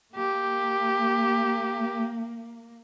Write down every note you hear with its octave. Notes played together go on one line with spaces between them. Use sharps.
A#3 G4